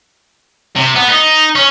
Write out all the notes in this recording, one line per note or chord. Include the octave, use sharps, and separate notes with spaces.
C3
B3
D#4
C#4